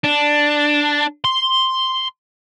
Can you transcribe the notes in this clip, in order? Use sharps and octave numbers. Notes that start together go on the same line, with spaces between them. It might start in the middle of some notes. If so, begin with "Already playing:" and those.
D4
C6